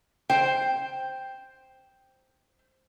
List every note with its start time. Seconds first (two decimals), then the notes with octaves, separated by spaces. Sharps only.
0.30 C5 G5